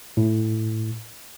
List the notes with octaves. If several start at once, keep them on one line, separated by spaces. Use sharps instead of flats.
A2